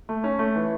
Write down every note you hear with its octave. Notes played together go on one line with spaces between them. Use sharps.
A3
C#4
A3
E3